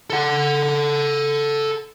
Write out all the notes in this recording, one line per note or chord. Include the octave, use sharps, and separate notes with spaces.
A4 F#5